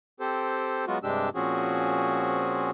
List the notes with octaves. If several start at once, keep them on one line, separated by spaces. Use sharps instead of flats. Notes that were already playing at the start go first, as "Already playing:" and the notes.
C4 G4 A4 C5
F#3 G#3 B3 F4 F#4
G2 C3 G#3 D4 G4 E6
A#2 F3 C4 C#4 F#4 G#4